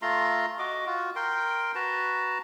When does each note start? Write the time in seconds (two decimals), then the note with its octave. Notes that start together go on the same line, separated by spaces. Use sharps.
0.02 A3 F4 A#5 C6
0.59 F#4 D#5 D6
0.86 F4 F#4
1.16 A#4 G5 C6
1.75 F#4 B4 A5 A#5